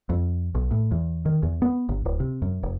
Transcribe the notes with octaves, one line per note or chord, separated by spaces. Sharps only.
F2
B1
A2
E2
D#3
E2
B3
G1
D1
C3
F#2
F1